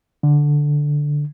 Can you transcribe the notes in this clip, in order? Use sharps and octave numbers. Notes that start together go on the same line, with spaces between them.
D3